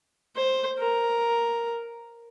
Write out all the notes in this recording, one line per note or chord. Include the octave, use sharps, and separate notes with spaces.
C5
A#4